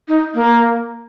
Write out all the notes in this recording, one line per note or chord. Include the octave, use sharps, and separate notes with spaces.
D#4
A#3